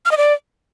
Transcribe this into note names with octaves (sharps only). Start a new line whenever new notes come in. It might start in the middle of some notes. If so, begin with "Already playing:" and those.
F6
D#5
D5